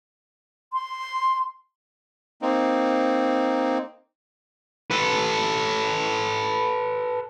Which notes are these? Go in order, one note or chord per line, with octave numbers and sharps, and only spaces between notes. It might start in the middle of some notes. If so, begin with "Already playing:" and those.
C6
A#3 C4 D#4
A4 B4